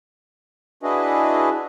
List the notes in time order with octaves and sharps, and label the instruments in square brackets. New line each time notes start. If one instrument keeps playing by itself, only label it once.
[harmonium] D4 E4 F#4 G#4 B4 D#5